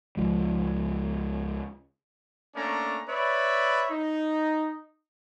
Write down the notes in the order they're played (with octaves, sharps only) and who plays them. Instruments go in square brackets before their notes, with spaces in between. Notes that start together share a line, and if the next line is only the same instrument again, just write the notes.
[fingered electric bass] C#2 F3 G#3
[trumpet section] A3 A#3 C#4 D4 A#5
B4 C#5 D5 E5 B5
D#4